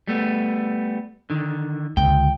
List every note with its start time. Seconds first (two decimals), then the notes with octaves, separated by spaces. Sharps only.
0.08 G3 A3 B3
1.30 D3 D#3
1.97 C#2 D3 G5